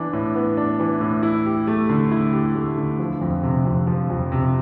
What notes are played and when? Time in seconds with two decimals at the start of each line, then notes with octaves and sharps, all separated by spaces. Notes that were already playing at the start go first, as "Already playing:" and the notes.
Already playing: E3 B3 D4
0.13 A2
0.35 B3
0.57 D4
0.80 E3
1.01 A2
1.23 E4
1.45 G4
1.67 A3
1.89 D3
2.11 E4
2.33 G4
2.55 A3
2.78 D3
2.99 F3
3.21 F2
3.43 C3
3.65 F2
3.87 F3
4.10 F2
4.32 C3